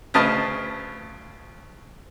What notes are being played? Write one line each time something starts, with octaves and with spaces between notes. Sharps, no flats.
D2 C#3 B4 D#5 A5 F6